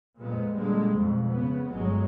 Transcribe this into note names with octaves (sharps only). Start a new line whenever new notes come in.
F2 A#2 G#3 B3
A#2 D3 G3 G#3
F2 B2
C#3 B3
G1 F#3 G#3